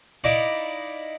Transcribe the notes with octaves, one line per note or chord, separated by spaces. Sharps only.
D#4 E4 D5 F5